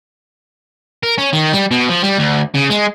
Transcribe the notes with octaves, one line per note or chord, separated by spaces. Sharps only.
A#4
C#4
D#3
G3
B2
F3
G3
D2
C#3
G#3